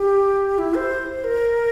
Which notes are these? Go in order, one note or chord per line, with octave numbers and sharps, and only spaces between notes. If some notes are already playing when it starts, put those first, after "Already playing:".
Already playing: G4
E4
C5
A#4